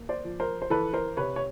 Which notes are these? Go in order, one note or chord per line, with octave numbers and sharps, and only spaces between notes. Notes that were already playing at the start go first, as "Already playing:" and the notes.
Already playing: A#3
C5 D5
F3
A#4 C5
C5
E3 A4 B4
A#4 C5
C3 B4 C#5
C#5